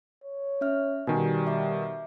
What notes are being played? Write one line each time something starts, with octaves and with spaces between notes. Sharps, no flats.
C#5
C#4 E5 F6
B2 D#3 G3 G#5
E5 D6